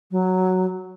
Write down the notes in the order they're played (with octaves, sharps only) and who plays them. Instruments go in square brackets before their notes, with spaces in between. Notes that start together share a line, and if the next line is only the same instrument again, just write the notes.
[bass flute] F#3